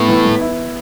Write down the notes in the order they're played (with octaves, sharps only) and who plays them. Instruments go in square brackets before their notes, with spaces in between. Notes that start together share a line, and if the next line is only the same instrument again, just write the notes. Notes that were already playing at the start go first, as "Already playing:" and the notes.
Already playing: [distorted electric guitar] A2 [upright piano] B3
[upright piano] E3
E3
E4